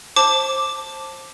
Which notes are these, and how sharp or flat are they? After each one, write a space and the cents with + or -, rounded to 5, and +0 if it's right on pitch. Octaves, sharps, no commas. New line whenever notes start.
C5 +25 A5 +0 D6 +0